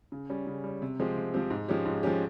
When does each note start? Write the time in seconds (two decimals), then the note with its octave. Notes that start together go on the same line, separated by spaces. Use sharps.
0.12 C#3
0.30 G3 C#4
0.47 C#3
0.64 G3 C#4
0.82 C3
1.00 F3 G#3 C4 G4
1.17 C3
1.34 F3 G#3 C4 G4
1.50 G#2
1.68 F3 G#3 C#4 G4
1.85 G#2
2.03 F3 G#3 C#4 G4